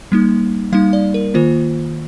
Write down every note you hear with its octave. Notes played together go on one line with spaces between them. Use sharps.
G3 A#3 D#4
G3 A#3 D#4 F5
D5
A#4
D#3 A#3 F4 C5